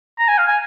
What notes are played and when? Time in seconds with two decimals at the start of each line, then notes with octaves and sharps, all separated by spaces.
0.19 A#5
0.28 G#5
0.38 F5
0.48 G#5